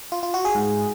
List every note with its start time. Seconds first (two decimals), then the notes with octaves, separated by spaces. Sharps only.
0.12 F4
0.23 F4
0.34 F#4
0.45 G#4
0.55 G#2